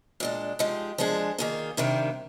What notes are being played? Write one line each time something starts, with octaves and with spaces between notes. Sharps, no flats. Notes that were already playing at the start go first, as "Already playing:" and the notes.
A#2 G#3 D4
F3 G#3 D#4 G4
F3 G#3 D4 G#4
D#3 A#3 F4 G#4
C3 D#3 G3 A#3 D4